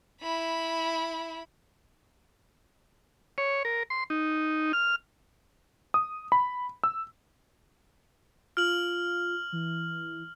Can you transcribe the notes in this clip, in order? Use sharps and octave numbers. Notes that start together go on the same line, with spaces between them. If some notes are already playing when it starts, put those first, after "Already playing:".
E4 B5
C#5
A#4
C6
D#4
F6
D#6
B5
E6
F4 F6 F#7
E3